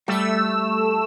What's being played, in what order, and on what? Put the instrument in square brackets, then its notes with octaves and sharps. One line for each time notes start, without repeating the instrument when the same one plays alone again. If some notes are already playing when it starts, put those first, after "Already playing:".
[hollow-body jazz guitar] G3 [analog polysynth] A3 E6